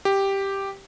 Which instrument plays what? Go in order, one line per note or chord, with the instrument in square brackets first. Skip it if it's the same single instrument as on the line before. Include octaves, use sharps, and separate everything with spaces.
[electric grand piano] G4